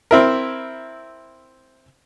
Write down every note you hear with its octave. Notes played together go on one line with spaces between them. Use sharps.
C4 E4 A#4